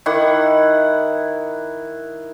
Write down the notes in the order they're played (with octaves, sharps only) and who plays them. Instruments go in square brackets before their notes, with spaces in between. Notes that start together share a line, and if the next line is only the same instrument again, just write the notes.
[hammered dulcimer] D#3 E4 F#5 D6